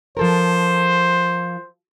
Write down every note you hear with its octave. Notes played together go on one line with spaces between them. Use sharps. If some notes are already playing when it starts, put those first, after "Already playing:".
F3 A4 A#4 C5